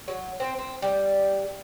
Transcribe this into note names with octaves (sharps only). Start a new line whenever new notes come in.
F#3
C4
C4
G3